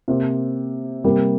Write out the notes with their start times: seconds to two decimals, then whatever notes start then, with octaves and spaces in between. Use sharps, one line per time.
0.08 C3 A#3 G4 C5
1.04 C3 G3 A#3 G4 A#4